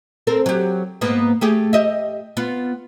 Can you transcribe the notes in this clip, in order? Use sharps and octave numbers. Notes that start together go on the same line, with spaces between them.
C4 A4 A#4
F#3 G4
G#2 A#3 B3
A3 G4 G#4
G4 D#5 E5
B3 F4